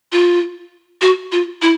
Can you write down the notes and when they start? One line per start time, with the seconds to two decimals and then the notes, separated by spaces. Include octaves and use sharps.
0.12 F4
1.01 F#4
1.32 F4
1.62 E4